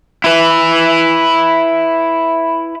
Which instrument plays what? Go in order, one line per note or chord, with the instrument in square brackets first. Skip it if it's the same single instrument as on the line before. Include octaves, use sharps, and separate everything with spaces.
[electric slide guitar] E4 B4